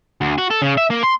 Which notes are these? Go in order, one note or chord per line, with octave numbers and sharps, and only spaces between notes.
D2
F#4
A4
C#3
E5
A#3
C6